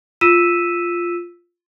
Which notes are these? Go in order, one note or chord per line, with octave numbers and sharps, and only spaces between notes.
F4 E6 B6 D#7 E7